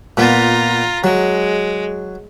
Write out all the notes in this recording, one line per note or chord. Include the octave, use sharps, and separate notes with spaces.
A#2 B3 F4 A#5
F#3 G#3